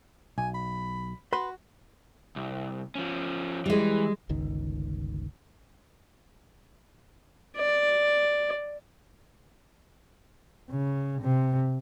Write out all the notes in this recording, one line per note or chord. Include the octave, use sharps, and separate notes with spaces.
B1 G#5
B5
F#4 B4 B5 C6
C2
F3 C#4
E3 G3 G#3
G1 C#2 D#3
D5
C#3
C3